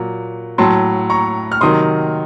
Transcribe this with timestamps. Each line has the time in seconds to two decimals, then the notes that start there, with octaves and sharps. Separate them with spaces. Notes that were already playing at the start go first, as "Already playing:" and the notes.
Already playing: A#2 F#3
0.58 A2 F#3 A5 C6
1.10 A#5 C#6
1.52 F6
1.61 C3 D#3 F#3 C6 D#6